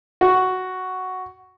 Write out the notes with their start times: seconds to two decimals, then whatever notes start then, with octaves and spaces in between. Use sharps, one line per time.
0.21 F#4